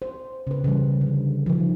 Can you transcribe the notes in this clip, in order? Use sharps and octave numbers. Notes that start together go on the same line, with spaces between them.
C5
C#3 B4
C#3 E3 G3
D3
D#3 F3